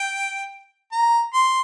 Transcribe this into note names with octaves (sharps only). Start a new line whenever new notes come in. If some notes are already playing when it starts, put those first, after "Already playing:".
Already playing: G5
A#5
C6